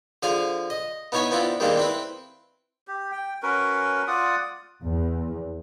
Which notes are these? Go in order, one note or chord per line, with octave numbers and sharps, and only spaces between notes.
D3 F3 G#4 F5 G#5
D#5
B3 D#4 E4 C#5 E5 G#5
B3 C4 D4 E4 F4
D#3 G3 G#3 A#3 C4 D4
C4 E4 B4
G4
G5
C#4 F#4 A#4 B4
F4 D5 F#5 D#6
E2